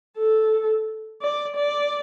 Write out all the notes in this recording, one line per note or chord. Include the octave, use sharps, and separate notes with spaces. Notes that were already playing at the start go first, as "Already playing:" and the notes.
A4
D5
D5